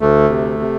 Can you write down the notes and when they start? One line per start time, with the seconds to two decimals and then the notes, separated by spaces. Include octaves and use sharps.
0.01 D2 A3
0.29 C3
0.59 C3